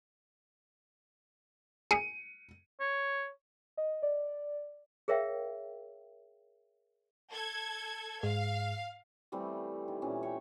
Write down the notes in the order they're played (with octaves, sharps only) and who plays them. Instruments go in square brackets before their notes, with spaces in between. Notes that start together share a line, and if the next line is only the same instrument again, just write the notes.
[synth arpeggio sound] G#4 [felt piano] C#7 D#7
[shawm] C#5
[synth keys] D#5
D5
[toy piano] G#4 A#4 C#5 E5 F5 G5
[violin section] A4 G#6
[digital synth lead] G#2 [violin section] F5
[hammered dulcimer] E3 G3 A3 C4
D#3
A#2 E3 C#4
C#5 G5